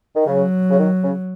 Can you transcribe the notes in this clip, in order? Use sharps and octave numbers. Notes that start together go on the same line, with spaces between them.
D#3
C#3 F#3
C#3
D#3
C#3